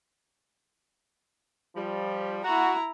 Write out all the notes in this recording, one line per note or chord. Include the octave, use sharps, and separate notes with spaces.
F3 G3
E4 F#4 A#5